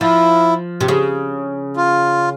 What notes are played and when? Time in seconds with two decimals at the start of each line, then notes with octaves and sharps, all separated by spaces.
0.01 F3 E4
0.81 C3
0.88 C#3
1.76 F4